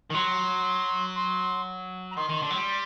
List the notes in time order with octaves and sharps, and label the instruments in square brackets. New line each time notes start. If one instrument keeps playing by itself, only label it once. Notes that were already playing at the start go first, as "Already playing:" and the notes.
[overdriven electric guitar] D#3
[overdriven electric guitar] F#3 [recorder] C6
[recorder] C6
A#5
[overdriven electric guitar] D#3 [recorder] C6
[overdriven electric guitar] D#3
D3
F#3
G3